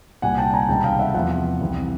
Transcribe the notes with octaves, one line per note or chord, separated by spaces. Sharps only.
C2 A#2 G3 F#5 G#5
G5 A5
G#5 A#5
C#2 C3 D#3 G3 G5 A5
F5 G5
E5 F#5
E2 C3 F3 E5 F#5
C2 C3 E3